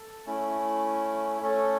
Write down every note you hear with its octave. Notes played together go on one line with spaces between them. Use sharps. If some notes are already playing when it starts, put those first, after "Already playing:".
Already playing: A4
A3 C#4 E4
A3 C#4 A4 C#5